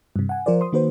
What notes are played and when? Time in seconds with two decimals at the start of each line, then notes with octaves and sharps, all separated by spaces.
0.16 G2 C3
0.29 F#5 G#5
0.46 F3 F4 A#4 C5 D5
0.61 C6 D#6
0.72 D#3 A#3 F#4 B4 C5